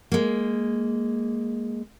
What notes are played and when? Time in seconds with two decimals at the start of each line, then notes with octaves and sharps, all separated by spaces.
0.12 G#3 A#3